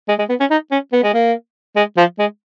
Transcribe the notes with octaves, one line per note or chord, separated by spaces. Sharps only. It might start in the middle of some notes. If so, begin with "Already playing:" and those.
G#3
G#3
B3
C#4
D#4
C#4
B3
G#3
A#3
G#3
F3
G#3